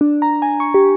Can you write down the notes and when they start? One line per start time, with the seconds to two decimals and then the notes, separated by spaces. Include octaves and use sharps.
0.01 D4
0.22 A#5
0.42 G#5
0.60 C#6
0.74 G4